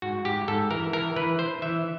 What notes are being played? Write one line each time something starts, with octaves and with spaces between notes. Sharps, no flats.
G#2 F#4
G#2 G4
G#2 A4
E3 A#4
E3 A#4
E3 B4
E3 C5
E3 E5